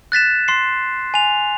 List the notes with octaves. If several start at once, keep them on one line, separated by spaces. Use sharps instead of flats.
F#6 A6 B6 E7
C6 C7
G#5 F7